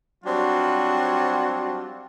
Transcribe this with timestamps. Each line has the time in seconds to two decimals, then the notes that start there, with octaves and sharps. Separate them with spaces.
0.25 F#3 G3 C4 D4 F4 F#4